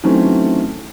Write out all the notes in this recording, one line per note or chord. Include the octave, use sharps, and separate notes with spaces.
D#3 E3 F#3 A3 C4 C#4